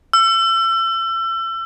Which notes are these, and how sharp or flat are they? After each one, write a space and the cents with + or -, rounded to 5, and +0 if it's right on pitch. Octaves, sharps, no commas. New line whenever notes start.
E6 +35